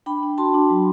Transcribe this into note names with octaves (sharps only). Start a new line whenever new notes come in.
D4 G5 B5
D4
F#4 A5 C6
D4
F#3